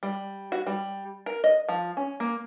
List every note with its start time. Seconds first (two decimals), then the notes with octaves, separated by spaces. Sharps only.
0.03 G3
0.52 F#4
0.67 G3
1.26 A#4
1.44 D#5
1.69 F3
1.97 C#4
2.20 A#3